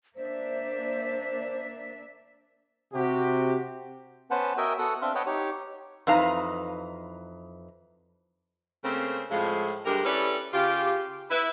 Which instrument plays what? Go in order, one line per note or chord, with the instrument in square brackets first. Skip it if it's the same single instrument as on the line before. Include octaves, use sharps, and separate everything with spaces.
[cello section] A#3 D4 E5 [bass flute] C5
[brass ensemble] C3 F#4 G4
[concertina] B3 C#4 B4 C5 F#5 A5
F#4 A#4 D#5 E5 G5 G#5
B3 F#4 A4 F#5 D#6 E6
C4 D4 E5 F5 C6 F6
B4 C#5 D#5 F#5 G5 A5
D#4 G4 C#5
[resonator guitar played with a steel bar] F2 E3 D#4 B4 F5 A#5
[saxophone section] C#3 A3 A#3 C4
A2 F3 G#3
D2 G2 G#3 G4 A#4
C#4 E4 G4 A4 B4 D5
C#3 F4 G4
E4 B4